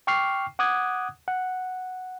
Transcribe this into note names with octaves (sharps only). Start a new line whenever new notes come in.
G5 C#6 D6 F6 C7
F#5 D6 D#6 F#6 G#6
F#5